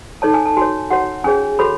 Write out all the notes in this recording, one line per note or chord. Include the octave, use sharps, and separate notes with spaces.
D#4 A4 C#5 A5
G#5
A5
F#4 C#5 G#5
F#4 C#5 F#5
C#4 G#4 C#5 G#5
F#4 A4 C#5 B5